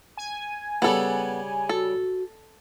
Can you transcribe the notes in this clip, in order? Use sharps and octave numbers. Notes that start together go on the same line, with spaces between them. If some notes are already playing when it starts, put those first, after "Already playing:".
G#5
C#3 G3 B3 A4
F#4 A4